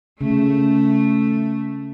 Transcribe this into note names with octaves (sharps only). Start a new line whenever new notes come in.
C#3 A3